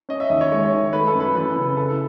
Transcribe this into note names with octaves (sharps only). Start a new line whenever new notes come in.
C#4 D#5
E5
D#2 D#5
C#5
G#3 C#5
D#3
A3 B4
A4
F#2
B4
E3 B4
C#3 B4
E4 A4